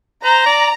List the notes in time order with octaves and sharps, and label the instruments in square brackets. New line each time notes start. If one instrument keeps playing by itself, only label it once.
[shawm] C5 [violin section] A#5
[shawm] D5